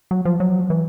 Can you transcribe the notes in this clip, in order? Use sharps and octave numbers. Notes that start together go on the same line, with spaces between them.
F#3
F3
F#3
E3